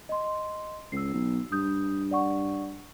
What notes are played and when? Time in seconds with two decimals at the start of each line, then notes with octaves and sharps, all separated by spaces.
0.09 D#5 C6
0.92 C#2 E6 C7
1.14 B1
1.52 G2 D#6 G6
2.11 D5 F#5 C#6